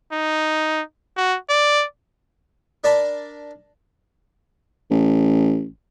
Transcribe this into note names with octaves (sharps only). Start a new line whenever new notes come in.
D#4
F#4
D5
D4 A#4 D5 A5 B5
A1